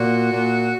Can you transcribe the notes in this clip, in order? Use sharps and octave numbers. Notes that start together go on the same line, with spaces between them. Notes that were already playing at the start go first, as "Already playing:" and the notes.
Already playing: A#2 F#4
A#2